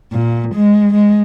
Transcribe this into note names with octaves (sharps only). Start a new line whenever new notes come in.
A#2
G#3
G#3